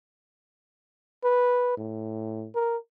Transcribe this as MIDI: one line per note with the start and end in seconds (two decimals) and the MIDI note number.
1.24 1.77 71
1.77 2.48 45
2.54 2.77 70